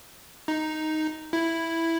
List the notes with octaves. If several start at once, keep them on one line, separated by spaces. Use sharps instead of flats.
D#4
E4